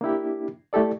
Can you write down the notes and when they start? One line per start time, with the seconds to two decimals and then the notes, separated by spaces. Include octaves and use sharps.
0.01 A#3 D4 E4 G4
0.73 A3 E4 G4 A4 D5